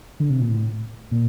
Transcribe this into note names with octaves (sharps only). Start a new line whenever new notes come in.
D3
C3
A#2
A2
A#2